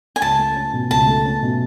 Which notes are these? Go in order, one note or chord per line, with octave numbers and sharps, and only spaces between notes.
G#5
C#2 A5
A3
C#4
B2
C#2 A5
A3
C#4
B2